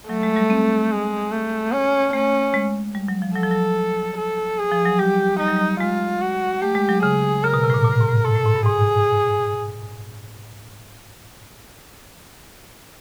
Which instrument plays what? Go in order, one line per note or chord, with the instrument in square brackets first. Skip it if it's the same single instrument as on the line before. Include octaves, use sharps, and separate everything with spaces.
[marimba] F#3 [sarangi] A3
[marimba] G#3
G3
C4
[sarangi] G#3
A3
C#4
[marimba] A3 [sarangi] C#4
[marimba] G#3
G3
F#3
F3
[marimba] F#3 [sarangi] A4
[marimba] F3
F#3
[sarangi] A4
G#4
[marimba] F3
F#3
[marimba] G3 [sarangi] G4
[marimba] G3 [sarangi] D#4
[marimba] F#3
G3
[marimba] G#3 [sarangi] F4
[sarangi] F#4
[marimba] A3 [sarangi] G4
[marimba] G#3
F#3
[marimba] C#3 [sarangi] G#4
[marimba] C#3 [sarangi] A#4
[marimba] B2
C3
A2
A#2
A#2
A2
G#2
A2
[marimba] G#2 [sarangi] A4
[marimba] A2
G#2
G2
[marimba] G#2 [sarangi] G#4